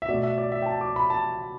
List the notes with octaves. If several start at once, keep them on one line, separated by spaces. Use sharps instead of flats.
E5
B2 A3 D5
E5
D5
E5
G5
A5
D6
B5
A5